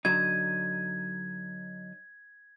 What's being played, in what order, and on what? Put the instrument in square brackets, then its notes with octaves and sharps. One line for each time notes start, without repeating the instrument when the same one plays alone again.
[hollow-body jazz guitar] D3 F#3 D#4 [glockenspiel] G#6